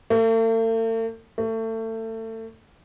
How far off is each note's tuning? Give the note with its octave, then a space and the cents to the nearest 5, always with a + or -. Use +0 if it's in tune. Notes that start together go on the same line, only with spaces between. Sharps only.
A3 +45
A3 +30